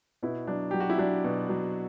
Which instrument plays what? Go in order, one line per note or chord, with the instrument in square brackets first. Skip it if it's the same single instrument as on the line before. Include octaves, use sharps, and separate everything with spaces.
[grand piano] B2 E4
F#3 D4
F#3 G4
F#4
E4
F#3 D4
B2
F#3